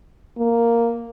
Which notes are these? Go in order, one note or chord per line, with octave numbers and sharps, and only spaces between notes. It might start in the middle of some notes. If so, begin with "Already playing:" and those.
A#3